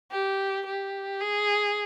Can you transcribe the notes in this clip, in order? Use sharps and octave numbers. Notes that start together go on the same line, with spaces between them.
G4
G4
G#4